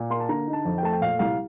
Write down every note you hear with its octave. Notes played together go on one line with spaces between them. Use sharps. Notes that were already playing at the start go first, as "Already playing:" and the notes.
Already playing: A#2
A#3 C6
A5
D3 A#5
D#4
A5
F2
G5
A3 A5
G5
A#2 F5
C2 F5